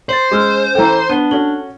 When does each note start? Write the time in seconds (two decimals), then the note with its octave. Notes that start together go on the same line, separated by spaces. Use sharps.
0.09 C5 A6 F#7
0.31 G#3 C#4 D6 E6 F6
0.75 E3 A4 G5 A#5
1.09 B3 D4 D#7 G7
1.31 C#4 F#4 A4 F#7 G7